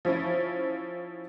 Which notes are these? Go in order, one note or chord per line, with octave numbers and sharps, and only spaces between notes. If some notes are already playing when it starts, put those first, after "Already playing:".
F3 C#4 E4